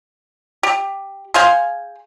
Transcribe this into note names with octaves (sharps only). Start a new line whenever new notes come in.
G4
G#4 C5 F5 G#5